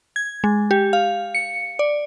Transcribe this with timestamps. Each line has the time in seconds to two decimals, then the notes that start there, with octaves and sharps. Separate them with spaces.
0.16 G#6
0.44 G#3
0.71 G4
0.93 F5
1.34 C#7
1.79 D5